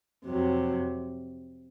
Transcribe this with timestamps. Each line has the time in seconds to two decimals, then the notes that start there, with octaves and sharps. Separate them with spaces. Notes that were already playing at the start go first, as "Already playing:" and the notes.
0.25 F2 C3 F#3